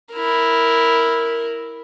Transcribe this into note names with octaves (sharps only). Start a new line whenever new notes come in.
E4 A#4